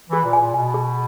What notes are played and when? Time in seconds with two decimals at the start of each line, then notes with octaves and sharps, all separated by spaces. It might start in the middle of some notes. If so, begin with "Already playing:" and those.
0.09 E3 G#4
0.24 A#2
0.33 G#5
0.39 A#2
0.54 B2 G#5
0.74 G#4